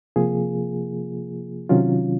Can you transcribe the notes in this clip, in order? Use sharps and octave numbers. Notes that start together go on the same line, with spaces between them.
C3 F3 A#3 F4 G#4
C3 D#3 F#3 C#4 F4